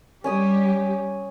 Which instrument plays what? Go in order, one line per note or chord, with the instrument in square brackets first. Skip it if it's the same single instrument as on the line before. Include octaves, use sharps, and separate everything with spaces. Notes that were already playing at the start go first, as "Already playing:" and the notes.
[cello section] G3 G4 [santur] C#4 G#5 D#6